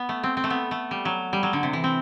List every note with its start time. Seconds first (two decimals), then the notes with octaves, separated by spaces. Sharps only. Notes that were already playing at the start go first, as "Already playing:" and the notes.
Already playing: B3
0.09 A3
0.23 C4
0.37 C4
0.44 A3
0.50 B3
0.71 A3
0.91 G3
1.05 F#3
1.33 G3
1.43 F#3
1.53 D3
1.63 C3
1.73 E3
1.84 C4